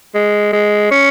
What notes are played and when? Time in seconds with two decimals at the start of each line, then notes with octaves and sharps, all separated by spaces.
0.15 G#3
0.53 G#3
0.91 C#4